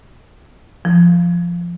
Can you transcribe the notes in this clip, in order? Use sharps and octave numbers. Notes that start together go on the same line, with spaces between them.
F3